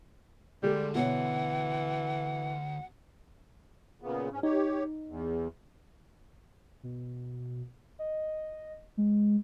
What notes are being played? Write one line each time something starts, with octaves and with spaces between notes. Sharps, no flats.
D2 G3 G#3 G4 A4
B2 E3 C#5 F#5
A#2 C#3 B3
G#2 C#4
D#4 G4 C#5
E2
B2
D#5
G#3